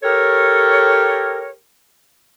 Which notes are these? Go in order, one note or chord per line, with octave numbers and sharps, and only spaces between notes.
G4 A4 A#4 C#5